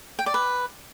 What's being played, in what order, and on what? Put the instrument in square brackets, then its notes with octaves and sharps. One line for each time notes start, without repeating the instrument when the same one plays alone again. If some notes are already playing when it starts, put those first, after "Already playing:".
[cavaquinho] G5
D5
B4